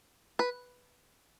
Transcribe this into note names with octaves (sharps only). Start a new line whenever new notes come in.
B4